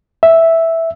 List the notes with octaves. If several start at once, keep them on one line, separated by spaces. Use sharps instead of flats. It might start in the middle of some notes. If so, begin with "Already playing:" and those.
E5